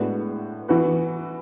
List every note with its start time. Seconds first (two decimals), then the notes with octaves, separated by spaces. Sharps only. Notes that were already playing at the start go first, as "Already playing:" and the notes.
Already playing: A2 G#3 B3 D4 F#4
0.68 E3 B3 F#4 B4